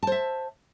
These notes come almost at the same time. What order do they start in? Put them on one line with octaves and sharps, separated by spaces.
A5 C5 E5